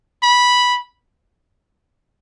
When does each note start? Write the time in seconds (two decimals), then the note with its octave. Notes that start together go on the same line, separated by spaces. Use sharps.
0.23 B5